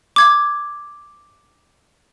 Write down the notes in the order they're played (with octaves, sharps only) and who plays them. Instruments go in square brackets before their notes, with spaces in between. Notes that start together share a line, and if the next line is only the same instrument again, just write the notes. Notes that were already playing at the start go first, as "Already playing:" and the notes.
[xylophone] D6 G#6